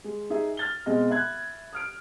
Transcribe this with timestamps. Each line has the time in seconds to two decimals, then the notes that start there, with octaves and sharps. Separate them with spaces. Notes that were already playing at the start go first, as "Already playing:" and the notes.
0.04 G#3
0.30 D#4 G#4 E5
0.57 F6 A6 G7
0.86 B2 G#3 C4 D#5
1.10 E5 B5 F#6 G#6
1.73 D#6 F6 D7